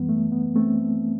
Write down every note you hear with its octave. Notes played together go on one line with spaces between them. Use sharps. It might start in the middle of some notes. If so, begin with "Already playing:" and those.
Already playing: F#2 E3 G3 B3
A3
B3
A3 C4